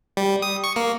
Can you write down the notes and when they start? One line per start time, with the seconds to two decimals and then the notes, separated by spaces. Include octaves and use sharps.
0.17 G3
0.42 D#6
0.64 C#6
0.76 A#3